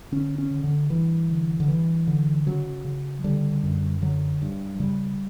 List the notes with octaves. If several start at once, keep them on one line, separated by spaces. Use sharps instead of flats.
D3 C#4
C#4
D3
D3
G2 E3
D3
D3
G2 E3
D3
C#3 F#3
C#3
D3 G3
F#2
D3 F#3
G2
C#3 G3